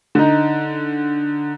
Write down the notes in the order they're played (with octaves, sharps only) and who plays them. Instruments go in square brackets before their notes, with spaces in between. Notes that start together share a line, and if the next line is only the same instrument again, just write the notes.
[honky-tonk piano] D3 D#4